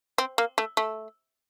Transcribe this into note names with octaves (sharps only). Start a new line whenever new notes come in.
C4
A#3
A3
A3